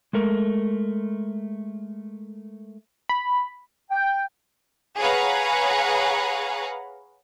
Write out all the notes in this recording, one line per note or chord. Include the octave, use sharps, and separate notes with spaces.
G#3 A3 A#4
B5
G5
G#4 B4 C#5 F5 F#5 A#5